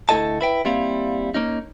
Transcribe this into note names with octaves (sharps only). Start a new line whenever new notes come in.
D2 A3 E4 A4 D#5 A5
E4 B4 G5
G3 A#3 C4 E4 F5
A#3 C#4 D#4